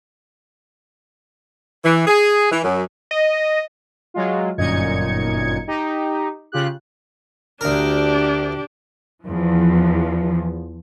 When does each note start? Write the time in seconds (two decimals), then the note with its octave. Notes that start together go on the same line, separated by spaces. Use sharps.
1.85 E3
2.07 G#4
2.51 E3
2.64 F#2
3.11 D#5
4.14 F#3 G#3 F4
4.58 G1 F#2 A#2 D#4 G#6 C#7
5.67 D#4 G4
6.52 C#3 F4 G4 F#6
7.61 D2 D4 G4 A#4
9.25 E2 F3